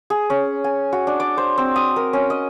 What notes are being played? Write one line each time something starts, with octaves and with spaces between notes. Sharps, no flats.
G#4
C#4
G#5
F#4
D4
D5
C5
C4
D#6
A#4
C#4
D#5